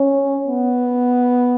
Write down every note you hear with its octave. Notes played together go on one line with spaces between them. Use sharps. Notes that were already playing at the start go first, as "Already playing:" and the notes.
Already playing: C#4
B3